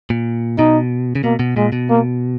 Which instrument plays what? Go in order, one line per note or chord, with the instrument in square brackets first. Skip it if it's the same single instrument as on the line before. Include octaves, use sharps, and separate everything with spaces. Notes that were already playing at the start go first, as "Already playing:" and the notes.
[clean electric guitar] A#2
[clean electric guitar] B2 [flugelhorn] D#4
[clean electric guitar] C#3
[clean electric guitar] B2 [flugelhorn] A#3
[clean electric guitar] B2
[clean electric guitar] A#2 [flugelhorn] G#3
[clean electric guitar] B2
[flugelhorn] A#3